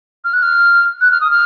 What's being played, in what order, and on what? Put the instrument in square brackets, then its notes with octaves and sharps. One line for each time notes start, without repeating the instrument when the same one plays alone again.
[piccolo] F6
F#6
F6
F#6
F6
D#6
F6